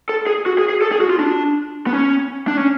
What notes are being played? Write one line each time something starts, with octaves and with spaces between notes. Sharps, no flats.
A4
G#4
F#4
G#4
G#4
A4
G#4
F#4
F4
D4
B3
C#4
D4
C#4